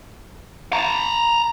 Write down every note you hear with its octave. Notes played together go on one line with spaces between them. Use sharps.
A5 A#5